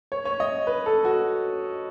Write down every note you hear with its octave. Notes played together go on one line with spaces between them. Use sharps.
C#5
C#5
D#5
B4
A4
F#4